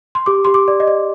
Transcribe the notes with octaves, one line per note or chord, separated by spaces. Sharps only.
C6
G4 D6
G4 C6
D6
D5
D#5
D5